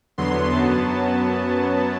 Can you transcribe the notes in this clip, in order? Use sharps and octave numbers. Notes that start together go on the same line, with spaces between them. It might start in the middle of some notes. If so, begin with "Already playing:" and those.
E2 D3 F#3 B3 C6
F#2 F#3 B3 A5